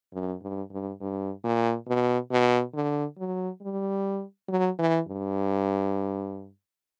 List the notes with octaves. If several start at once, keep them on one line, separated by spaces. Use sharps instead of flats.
F#2
G2
G2
G2
A#2
B2
B2
D3
F#3
G3
F#3
E3
G2